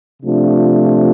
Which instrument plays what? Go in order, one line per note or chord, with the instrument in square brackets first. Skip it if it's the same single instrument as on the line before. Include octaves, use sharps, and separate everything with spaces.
[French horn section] C3 F3 A3 D4 F4